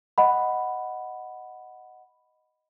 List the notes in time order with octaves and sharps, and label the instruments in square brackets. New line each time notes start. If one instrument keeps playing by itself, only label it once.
[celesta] D#5 F#5 B5